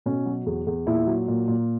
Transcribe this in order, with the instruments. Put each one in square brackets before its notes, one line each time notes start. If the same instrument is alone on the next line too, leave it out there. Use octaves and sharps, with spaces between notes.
[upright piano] B2 C#4
F#3
E2
E2
A#2 E4
F#3
A#2
A#2